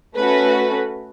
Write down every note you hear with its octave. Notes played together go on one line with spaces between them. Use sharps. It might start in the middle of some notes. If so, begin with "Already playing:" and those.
A3 C#4 F#4 A4 B4